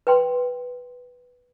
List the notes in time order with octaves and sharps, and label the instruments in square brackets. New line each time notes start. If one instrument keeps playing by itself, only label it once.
[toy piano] B4 G5 C6